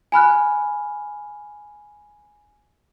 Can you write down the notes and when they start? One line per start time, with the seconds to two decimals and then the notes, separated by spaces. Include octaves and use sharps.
0.12 G#5 B5 F6 F#6